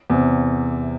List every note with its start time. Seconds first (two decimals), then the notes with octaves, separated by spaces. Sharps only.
0.10 E2 C3